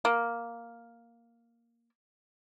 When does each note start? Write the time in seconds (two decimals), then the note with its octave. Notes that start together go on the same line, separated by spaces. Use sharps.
0.05 A#3